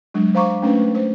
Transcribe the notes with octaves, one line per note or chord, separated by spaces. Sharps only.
F#3 G#3 D4
C5 F5 A#5 C#6 D6
A3 C#4 D4 B4
C5